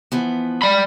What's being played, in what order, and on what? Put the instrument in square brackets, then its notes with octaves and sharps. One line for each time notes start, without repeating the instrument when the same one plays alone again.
[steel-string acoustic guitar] E3 F3 B3
[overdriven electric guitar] D5 B5